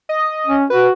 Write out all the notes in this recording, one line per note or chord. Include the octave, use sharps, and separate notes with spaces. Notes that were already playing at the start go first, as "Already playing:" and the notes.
D#5
C#4
F#4 B4